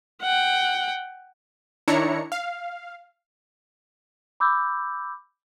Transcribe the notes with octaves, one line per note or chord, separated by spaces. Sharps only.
F#5 G5
D#3 D4 E4 C#5 A#5 C#7
F5
B5 D6 E6 G6